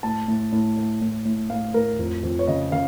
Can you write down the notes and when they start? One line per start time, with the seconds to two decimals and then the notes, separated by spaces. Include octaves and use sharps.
0.03 A2 A5
0.28 A2
0.52 A2
0.77 A2
1.01 A2
1.25 A2
1.50 A2 F5
1.74 A2 A#4
1.99 F2
2.23 F2
2.39 C#5
2.48 C#3 D#5
2.72 C#3 F5